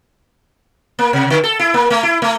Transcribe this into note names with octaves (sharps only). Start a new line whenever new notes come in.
A#3
C3
D3
A4
E4
A#3
A3
E4
A3